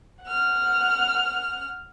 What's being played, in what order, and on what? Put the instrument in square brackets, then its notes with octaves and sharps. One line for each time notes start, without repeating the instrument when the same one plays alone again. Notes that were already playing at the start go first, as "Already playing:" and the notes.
[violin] F#5 F6